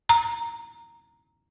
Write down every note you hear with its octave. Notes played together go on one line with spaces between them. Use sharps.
A#5